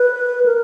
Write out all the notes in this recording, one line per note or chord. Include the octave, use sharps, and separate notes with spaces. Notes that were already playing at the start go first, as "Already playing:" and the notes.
Already playing: B4
A#4